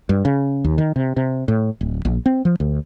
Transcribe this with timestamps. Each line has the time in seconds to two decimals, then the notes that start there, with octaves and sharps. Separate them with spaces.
0.09 G2
0.25 C#3
0.64 D#2
0.78 D#3
0.96 C3
1.17 C3
1.48 A2
1.81 D1
2.05 A#1
2.26 C4
2.45 F3
2.60 D2